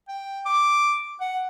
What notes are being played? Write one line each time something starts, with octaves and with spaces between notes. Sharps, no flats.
G5
D6
F#5